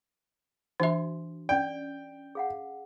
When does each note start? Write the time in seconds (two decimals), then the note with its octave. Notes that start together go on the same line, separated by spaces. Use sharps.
0.80 E3 D4 F#4 E5
1.49 C#4 D5 G5
2.35 G#4 F5 F#5